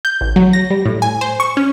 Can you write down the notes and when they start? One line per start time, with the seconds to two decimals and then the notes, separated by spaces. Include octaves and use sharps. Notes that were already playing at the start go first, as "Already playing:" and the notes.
0.05 G6
0.21 A1
0.36 F#3
0.53 A#6
0.70 G3
0.85 A2
1.02 G#5
1.21 C5
1.40 C#6
1.57 C#4